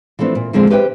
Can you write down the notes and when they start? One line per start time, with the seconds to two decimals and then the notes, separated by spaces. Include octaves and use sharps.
0.19 E3 F3 A3 C4 D4
0.35 A#2
0.53 A#2 D3 F3 G#3 C4
0.70 G4 B4 C5 E5 F5 G5